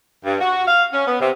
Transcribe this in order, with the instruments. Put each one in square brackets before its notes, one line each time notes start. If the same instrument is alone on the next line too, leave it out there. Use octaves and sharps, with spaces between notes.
[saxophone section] G2
F#4
F5
C#4
B3
C3